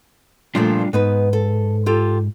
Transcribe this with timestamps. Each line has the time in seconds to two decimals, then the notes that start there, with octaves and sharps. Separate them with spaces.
0.55 A#2 F3 G3 A3 D4 F4
0.93 G#2 B3 D#4 B4
1.33 A4
1.86 F4 G4 A4